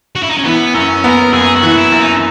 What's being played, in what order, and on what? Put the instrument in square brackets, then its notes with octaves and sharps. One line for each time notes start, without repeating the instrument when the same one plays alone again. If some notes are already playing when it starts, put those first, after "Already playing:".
[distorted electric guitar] F#4
E4
D#4
C#4
[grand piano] E3 [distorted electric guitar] B3
[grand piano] F#2 [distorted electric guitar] C#4
[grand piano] B3 [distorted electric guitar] A#4
[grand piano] F#2 [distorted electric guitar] G#4
[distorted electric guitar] F#4
[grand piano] E3
[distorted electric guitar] E4
[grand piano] F#2
[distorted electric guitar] D#4